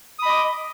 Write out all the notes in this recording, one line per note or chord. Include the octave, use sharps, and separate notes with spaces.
D#5 B5 D6 D#6